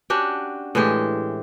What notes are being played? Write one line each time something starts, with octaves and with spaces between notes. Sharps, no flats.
C#4 D4 F#4 G4
A2 E3 G#3 G4